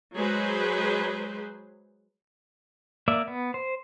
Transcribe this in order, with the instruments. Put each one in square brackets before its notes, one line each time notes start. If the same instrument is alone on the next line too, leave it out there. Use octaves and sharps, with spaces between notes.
[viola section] F#3 G#3 G#4 B4 C5
[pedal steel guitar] A#3 D5 E5
B3
C5